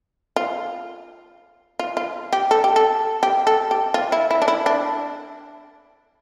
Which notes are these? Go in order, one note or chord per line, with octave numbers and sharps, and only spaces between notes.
F4
F4
F4
G4
A4
G4
A4
G4
A4
G4
F4
E4
E4
D4
E4
D4